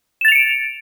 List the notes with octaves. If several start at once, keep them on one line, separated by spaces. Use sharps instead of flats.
A6 C#7 D7 E7 F7